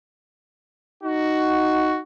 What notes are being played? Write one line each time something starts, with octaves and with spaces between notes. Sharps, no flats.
D#4 F#4